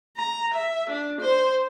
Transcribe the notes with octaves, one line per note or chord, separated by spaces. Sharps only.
A#5
E5
D4
C5